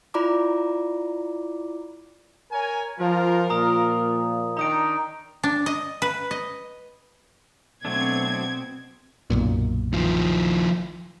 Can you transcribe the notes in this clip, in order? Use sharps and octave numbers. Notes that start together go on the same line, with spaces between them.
E4 F4 D5 A#5 B5 D6
A#4 C#5 G#5
F3 F4 A#4
A#2 F3 A#5 D#6
D#3 D4 D#4 A#5 D#6 D7
D4
D#5
B4
D#5
B2 F#3 A3 C4 D4 G#6
B1 F#2 A#2
D#3 F3